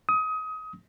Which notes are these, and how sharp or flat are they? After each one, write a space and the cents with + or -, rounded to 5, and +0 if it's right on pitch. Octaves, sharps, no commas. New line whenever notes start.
D#6 +25